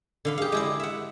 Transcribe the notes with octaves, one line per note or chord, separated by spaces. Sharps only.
D3 F5 B5
G4 G#4 F5
G#3 E4 D5
E5 F#5